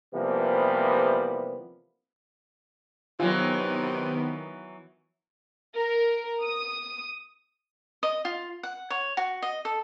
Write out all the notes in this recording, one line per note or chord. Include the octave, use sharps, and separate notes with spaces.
C3 E3 F3 G3 A#3 B3
C3 D#3 E3 F#3 B3 F4
A#4
D#6
D#5
F4
F#5
C#5
F#4
D#5
A4